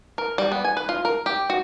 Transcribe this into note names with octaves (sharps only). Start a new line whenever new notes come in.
A#4
G3
B3
G#5
B4
F4
A#4
G4
F#4